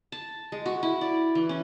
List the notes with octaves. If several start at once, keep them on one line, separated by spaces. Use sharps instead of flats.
A5
G#3
F#4
E4
D5
E3
C#4